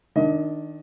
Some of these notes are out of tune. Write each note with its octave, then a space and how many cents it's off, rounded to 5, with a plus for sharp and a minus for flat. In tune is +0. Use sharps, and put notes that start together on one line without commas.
D#3 +0 D4 +0 D#5 +30